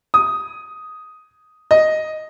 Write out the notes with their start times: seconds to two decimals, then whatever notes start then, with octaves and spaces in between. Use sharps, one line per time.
0.14 D#6
1.71 D#5